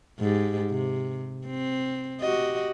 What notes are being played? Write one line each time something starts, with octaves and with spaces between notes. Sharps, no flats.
G#2 G4
C3
C4
F#4 G4 D#5